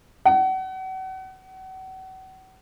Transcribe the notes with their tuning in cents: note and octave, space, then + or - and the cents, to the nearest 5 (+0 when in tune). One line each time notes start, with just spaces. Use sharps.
F#5 +35